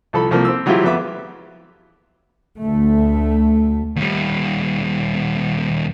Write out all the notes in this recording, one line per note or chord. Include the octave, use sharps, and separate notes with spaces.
C2 F3 A4 B5
C2 F3 A#3 C4
C4 E6
E3 F#3 G#3 E4 F4 G4
F2 B3 E5 D6
D2 A3
D#2 G3